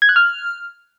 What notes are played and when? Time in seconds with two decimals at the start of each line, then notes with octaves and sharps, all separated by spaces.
0.02 G#6
0.09 F#6
0.16 F6